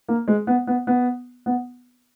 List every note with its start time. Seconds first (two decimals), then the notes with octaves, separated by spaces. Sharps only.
0.08 A#3
0.28 G#3
0.47 B3
0.67 B3
0.87 B3
1.46 B3